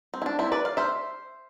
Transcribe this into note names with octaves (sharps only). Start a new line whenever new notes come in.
C4
E4
D4
C4 E4
B4 D5
D5 F5
C5 E5